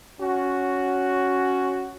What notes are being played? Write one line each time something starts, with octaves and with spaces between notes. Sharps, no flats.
C#4 F#4